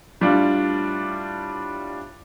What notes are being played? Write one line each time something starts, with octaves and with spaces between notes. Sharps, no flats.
A2 G3 D4 F4